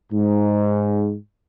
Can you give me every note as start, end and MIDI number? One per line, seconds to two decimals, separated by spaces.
0.12 1.15 44